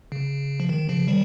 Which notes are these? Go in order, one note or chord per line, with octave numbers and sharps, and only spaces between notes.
C#3
F3
D#3
C#3 F3
D#3 G3